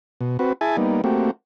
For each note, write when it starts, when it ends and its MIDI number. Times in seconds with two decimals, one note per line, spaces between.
0.21 0.37 47
0.39 0.53 60
0.39 0.53 66
0.39 0.53 71
0.61 0.77 64
0.61 0.77 68
0.61 0.77 76
0.61 0.77 80
0.61 0.77 81
0.77 1.01 55
0.77 1.01 58
0.77 1.01 59
0.77 1.01 63
1.04 1.31 57
1.04 1.31 58
1.04 1.31 60
1.04 1.31 66
1.04 1.31 67